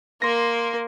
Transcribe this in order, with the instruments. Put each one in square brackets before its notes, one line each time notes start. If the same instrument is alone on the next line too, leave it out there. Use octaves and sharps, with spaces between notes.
[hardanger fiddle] A#3 A#4 [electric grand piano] C6 A#6